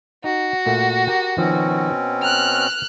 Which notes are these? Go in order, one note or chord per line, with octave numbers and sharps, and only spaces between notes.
D#4 F#4
A#2 A3 A#3
G4 A#4 G5
B2 D#3 F3 C4 C#4
G5 A#5 F6 F#6